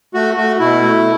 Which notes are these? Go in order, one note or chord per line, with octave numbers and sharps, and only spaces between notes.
A3 F#4
A3 F#4
B2 E4
A3